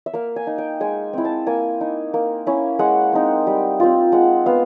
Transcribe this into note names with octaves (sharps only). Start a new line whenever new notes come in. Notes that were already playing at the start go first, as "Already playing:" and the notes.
E5
A#3 F5
G#5
D#4
G5
G#3 G#5
C4 E4
A5
A#3 G#5
D#4
A#3
C#4 E4
G#3 F#5
C4 D#4
G3
C4 F4
G#3 F#5
B3 F5